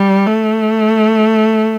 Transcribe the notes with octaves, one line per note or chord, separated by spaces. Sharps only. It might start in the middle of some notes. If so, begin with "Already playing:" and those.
Already playing: G3
A3